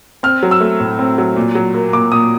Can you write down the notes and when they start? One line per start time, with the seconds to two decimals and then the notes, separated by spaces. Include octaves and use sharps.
0.23 C4 F6
0.43 F#3
0.51 E6
0.61 A3
0.80 A2
0.99 C4
1.18 F#3
1.36 A#2
1.55 F#3
1.74 A#3
1.93 A#2 D6
2.12 A#2 D#6